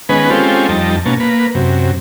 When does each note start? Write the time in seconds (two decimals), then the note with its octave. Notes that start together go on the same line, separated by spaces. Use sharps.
0.09 D#3 G#3 B3 C#4 B4
0.30 G#3 C4 C#4 F4 G4 A4
0.69 F2 G3 D#4 A5
1.06 B2 A#3 C#4 A5
1.20 A#3 B4
1.55 F#2 C3